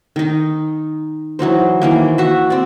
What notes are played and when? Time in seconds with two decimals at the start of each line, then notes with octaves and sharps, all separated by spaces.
0.16 D#3 D#4
1.39 E3 F#3 D#4 C5
1.82 D#3 E3 A#3
2.18 F#4 E5
2.50 C4 D5